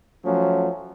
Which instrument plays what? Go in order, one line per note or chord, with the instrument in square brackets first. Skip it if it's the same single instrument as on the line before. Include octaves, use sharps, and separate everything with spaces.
[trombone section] F3 F#3 A3 C#4